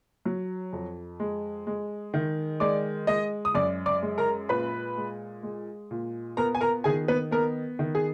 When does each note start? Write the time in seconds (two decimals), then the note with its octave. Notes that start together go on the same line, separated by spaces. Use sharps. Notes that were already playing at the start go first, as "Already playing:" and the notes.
0.25 F#3
0.73 F2
1.20 G#3
1.67 G#3
2.14 D#3
2.60 G#3 D5 D6
3.07 G#3 D#5 D#6
3.45 D#6
3.55 F#2 D5 D6
3.86 D5 D6
4.02 G#3
4.18 A#4 A#5
4.49 A#2 B4 B5
4.97 G#3
5.43 G#3
5.91 A#2
6.37 B3 A#4 A#5
6.55 G#5
6.61 A#4 A#5
6.84 D#3 G#4 G#5
7.08 B3 B4
7.31 B3 A#4
7.79 D#3
7.95 G#4